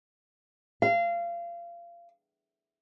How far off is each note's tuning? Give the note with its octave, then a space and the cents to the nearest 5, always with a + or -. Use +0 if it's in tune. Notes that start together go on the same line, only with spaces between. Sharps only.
F5 -25